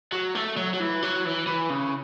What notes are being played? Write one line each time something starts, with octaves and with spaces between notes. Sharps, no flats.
F#3
A3
F#3
F#3
E3
F#3
E3
E3
C#3